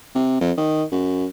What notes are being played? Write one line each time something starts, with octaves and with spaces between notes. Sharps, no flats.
C3
F2
D#3
F#2